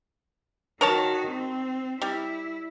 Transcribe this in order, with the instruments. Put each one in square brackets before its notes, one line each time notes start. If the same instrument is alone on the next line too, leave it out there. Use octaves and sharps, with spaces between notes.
[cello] D#3 F#4 [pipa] A#4 C#5 A5
[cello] C4
[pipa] G3 [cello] E4